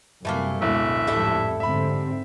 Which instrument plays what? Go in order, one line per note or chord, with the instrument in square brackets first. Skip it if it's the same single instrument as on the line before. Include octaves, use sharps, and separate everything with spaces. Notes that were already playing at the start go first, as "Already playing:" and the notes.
[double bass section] F#2 C3 G3 [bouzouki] E3 A3 A#3
[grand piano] D1 [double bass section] B2 G#3 [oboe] E5
[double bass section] A1 F2 G#2 [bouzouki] G3 E4 A4
[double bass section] G#2 D3 C4 [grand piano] E5 B5